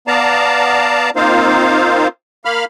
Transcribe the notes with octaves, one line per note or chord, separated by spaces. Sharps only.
B3 D5 F5 A5 A#5
A#3 C4 D#4 F4 C5 F5
A#3 F5 B5 F6